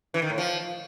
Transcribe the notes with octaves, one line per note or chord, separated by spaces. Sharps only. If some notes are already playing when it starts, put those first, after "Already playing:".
E3
D#3
A2
F3